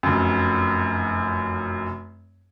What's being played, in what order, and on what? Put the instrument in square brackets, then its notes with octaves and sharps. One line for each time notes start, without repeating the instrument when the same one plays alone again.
[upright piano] F1 F#2